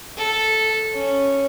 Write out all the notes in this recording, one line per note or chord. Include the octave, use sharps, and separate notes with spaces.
A4
C#4